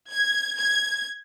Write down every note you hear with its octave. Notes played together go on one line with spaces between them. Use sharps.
G#6
G#6